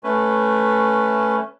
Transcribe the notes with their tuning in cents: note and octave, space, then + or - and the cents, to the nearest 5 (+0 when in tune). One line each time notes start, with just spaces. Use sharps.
A3 +0 C#4 -5 B4 +0